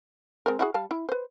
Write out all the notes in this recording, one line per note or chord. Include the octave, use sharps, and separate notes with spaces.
G#3 C4 A#4
E4 F#4 G#4
G3 F5 A5
E4
B4 C5